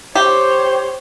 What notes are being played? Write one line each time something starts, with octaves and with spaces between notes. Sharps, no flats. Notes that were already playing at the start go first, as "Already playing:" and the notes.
G4 C5 C#5